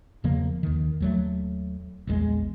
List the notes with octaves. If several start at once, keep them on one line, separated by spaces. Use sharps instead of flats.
E2 C#3 F3 A#3
D#2 D#3
D#2 F#3 A3
A#1 E2 D3 G#3